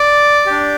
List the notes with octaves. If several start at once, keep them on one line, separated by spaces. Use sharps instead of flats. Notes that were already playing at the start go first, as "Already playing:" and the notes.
Already playing: D5
D4 G4